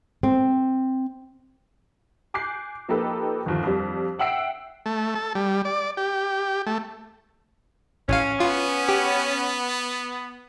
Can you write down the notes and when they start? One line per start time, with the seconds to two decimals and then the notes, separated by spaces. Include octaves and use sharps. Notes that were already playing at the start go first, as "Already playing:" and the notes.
0.23 C4
2.34 G#5 D6 F#6 G6 C7
2.88 F3 A#3 D#4 G4 A4 B4
3.46 G1 D#2 F3
3.64 F2 G3
4.19 E5 F#5 G5 E6 C7 D7
4.86 A3
5.15 A4
5.35 G3
5.65 D5
5.97 G4
6.66 A3
8.09 A1 C#4 F5
8.40 B3 F4
8.89 G4